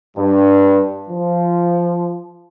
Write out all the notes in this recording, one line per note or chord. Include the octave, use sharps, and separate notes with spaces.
G2
F3